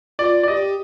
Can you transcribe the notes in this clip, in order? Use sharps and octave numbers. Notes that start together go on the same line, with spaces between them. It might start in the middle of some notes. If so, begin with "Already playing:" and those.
F4 D5
D5
G4 D#5